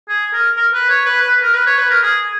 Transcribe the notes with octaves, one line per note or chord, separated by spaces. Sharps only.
G#4
A#4
A#4
B4
C#5
B4
B4
A#4
B4
C#5
B4
A#4
G#4